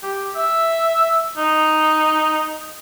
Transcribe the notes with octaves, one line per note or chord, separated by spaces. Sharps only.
G4
E5
D#4